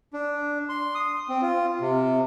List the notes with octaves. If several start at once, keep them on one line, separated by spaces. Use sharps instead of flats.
D4
C6
D#6
C4
F4
C3